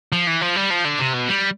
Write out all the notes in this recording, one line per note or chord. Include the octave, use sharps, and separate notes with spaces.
F3
E3
F3
G3
F3
D3
C3
B2
G3